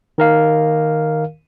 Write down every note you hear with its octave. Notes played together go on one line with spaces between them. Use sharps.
D#3 A#4 F5